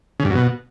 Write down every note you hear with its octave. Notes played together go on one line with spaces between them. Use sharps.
C#3
G2
F#2
B2